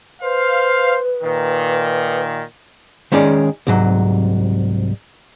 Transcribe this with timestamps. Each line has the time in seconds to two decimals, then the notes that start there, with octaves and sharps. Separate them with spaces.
0.22 B4 C5 F5
1.22 A#2 D#3
3.12 D#3 G#3 C#4 G#4 D5
3.67 C2 G#2 F#3